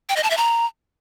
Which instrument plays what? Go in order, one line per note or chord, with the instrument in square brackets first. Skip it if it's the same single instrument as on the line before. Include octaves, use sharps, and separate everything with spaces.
[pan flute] G5
D#5
A5
E5
A#5